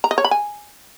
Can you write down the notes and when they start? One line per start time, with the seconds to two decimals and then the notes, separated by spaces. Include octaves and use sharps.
0.04 A#5
0.11 D#5
0.18 C#5
0.25 B5
0.31 G#5